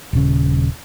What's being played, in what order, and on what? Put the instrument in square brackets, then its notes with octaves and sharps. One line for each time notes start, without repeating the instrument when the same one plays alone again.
[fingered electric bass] D#1 C#3